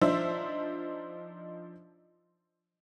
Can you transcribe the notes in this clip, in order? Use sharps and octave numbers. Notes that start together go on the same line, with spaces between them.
F3 D4 D#4 C5 E5 E6